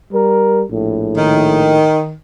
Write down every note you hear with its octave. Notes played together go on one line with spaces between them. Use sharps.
G3 A#4
A#1 A2
D#3